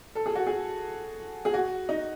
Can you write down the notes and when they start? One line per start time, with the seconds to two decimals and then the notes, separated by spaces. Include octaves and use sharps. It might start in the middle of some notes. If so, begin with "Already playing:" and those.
0.15 A4
0.26 G#4
0.35 F#4
0.47 G#4
1.45 G#4
1.54 F#4
1.89 D#4